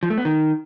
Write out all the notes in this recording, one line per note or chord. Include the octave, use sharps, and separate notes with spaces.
F3
A3
B3
D#3